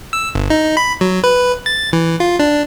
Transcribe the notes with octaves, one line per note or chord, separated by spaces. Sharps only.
E6
G1
D#4
B5
F#3
B4
A6
E3
F4
D4